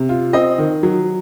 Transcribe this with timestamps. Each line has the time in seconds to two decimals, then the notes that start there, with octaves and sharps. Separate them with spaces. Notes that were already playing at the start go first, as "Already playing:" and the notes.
Already playing: C3
0.09 F4
0.33 C4 D#5
0.58 D#3
0.83 F#3